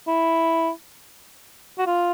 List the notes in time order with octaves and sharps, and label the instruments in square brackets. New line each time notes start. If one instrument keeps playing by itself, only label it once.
[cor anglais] E4
F#4
F4